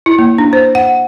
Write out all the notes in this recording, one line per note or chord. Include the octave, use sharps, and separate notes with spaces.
E4
A#3
D4
C5
F#5